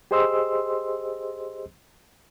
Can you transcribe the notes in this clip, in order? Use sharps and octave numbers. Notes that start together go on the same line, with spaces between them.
G4 G#4 C5 D#5 C6 E6